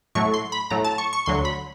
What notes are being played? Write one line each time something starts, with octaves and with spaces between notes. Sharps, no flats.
A2 F#3 A3 C#6
C6
B5
A2 F#3 A3 A#5
A5
C#6
C#6
D2 D3 F#3 C6
B5